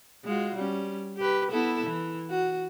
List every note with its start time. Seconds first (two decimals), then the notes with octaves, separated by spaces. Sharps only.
0.25 G#3 F4 F#4
0.56 G3 C#4
1.18 G4 B4
1.51 B3 E4 A4
1.87 E3
2.30 F#4